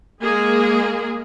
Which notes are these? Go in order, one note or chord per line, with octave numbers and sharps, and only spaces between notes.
G#3 A#3 G#4